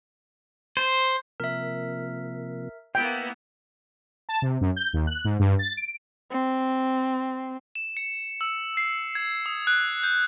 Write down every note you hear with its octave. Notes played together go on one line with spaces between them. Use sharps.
C5
C3 F3 A#3 A#4 E5
A#3 B3 E4 G5
A5
C3
F#2
G6
D#2
F#6
G#2
G2
A6
D7
C4
E7
C#7
E6
C7
G#6
D#6
F#6
G6